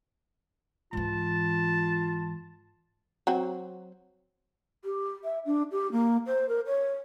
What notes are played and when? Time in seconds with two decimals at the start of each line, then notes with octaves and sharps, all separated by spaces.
0.93 G#2 E3 F4 A5
3.27 F#3 C4 F#4
4.85 G4
5.24 E5
5.46 D4
5.72 G4
5.92 A#3
6.26 C5
6.49 A#4
6.66 C#5